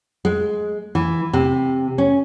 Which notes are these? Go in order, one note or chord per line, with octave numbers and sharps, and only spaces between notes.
G#3
E3
C3
C#4